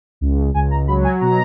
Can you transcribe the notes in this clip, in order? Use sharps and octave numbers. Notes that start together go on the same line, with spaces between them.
C#2
C#2 G#5
A#5
F#3 B5
G#5
B2 A#5